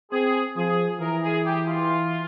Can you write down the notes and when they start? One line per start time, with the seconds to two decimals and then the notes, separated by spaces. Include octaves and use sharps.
0.11 C4 G#4
0.56 F3 G#4
1.00 E3 A#4
1.23 G#4
1.45 G4
1.67 F4